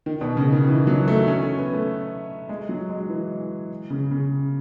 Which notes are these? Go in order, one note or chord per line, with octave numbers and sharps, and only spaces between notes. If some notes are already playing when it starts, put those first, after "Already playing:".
D#3
B2
C#3
D#3
E3
F#3
A3
C#4
C#4
B3
A3
G#3
F#3
G#3
E3
C#3
C#3